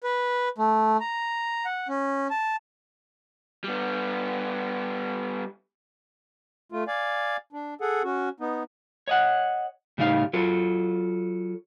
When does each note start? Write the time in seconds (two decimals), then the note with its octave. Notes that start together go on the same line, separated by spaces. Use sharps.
0.03 B4
0.58 A3
1.01 A#5
1.65 F#5
1.89 C#4
2.30 A5
3.64 G3 B3
6.72 A3 F4
6.88 D5 F5 G#5
7.53 D4
7.81 G#4 A4 F#5
8.04 C#4 F#4
8.40 B3 D#4
9.08 C#5 D#5 F#5
9.98 A2 C#3 G3 D#4 F5
10.33 F#3 F4 A4